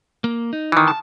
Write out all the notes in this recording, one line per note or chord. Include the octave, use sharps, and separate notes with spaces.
A#3
D#4
D#3 E3
A5